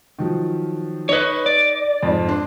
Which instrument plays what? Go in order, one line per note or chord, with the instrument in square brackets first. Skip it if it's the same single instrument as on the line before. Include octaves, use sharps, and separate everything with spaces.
[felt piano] D#3 F3 F#3
[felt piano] D#4 D#5 [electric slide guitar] B4 C#5
[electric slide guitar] D5
[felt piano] F2 G#2
D4 C6